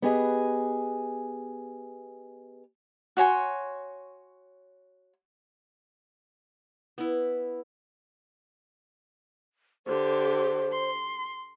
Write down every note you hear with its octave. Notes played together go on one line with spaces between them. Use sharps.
B3 G4 G#4 B4 D#5 G#5
F#4 C#5 G#5 C6
B3 E4
D3 G4 C5
C6